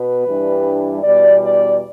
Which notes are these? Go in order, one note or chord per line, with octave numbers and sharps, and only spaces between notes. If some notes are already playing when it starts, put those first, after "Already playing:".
Already playing: B2 B3 B4
G2 E3 G3 D4
E2 B2 G3 D5
D5